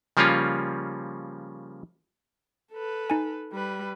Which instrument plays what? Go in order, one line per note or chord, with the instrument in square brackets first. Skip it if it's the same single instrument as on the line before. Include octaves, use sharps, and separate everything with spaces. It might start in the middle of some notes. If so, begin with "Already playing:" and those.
[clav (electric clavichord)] C#3 F3 G3 A#3 C#4 F4
[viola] A4 B4
[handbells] D#4 G#5
[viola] G3 B4